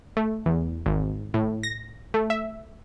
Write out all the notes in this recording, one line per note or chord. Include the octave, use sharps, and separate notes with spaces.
A3
E2
G#1
A2
A#6
A3
E5